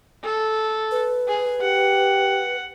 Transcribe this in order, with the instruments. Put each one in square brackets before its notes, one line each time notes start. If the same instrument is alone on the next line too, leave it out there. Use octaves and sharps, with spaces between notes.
[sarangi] A4
[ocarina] B4
[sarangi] G#4
[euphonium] G4 [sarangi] F#5